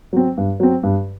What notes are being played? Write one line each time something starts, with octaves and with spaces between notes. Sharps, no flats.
F#3 C4
G2
F#3 C4
G2